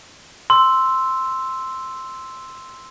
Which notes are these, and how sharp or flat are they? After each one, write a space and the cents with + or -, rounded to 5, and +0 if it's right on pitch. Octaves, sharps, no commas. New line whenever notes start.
C6 +0 E6 +0